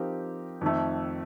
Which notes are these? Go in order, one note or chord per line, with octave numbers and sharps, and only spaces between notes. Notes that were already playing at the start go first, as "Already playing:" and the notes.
Already playing: F3 C4 D#4 G4 A#4
F2 D#3 A3